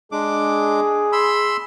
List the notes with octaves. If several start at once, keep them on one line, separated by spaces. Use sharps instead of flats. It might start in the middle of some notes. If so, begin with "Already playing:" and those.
G#3 D4 G#4 D6
B5 C6 E6